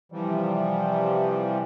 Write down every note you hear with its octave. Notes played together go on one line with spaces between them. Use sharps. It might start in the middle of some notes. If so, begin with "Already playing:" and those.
C3 E3 F3 G3